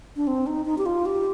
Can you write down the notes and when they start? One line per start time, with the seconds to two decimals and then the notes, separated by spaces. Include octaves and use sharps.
0.17 D4
0.27 C4
0.47 D#4
0.66 D#4
0.78 G4
0.86 F4
1.06 G4